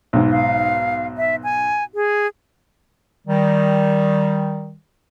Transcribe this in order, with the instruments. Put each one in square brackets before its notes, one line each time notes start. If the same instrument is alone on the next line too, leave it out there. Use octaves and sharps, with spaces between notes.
[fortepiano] B1 G#2
[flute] F5
E5
G#5
G#4
[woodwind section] D#3 G3